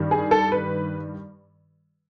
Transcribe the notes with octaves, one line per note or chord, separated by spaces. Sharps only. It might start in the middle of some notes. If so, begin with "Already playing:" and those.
Already playing: G2 D#3 G3
G#4
A4
B4